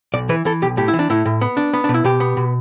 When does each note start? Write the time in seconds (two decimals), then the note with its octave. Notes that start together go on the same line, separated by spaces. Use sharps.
0.14 B1 D5
0.29 E3 B4
0.45 E3 A4
0.62 B1 G4
0.77 A2 G4
0.88 E4
0.93 E3
0.99 D4
1.10 A2 E4
1.26 A2
1.41 B3
1.57 D4
1.73 B3
1.84 D4
1.89 B2
1.94 E4
2.04 B2 G4
2.20 B3
2.37 B2